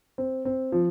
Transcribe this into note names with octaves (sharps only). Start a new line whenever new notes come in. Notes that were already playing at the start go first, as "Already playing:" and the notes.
C4
C4
F3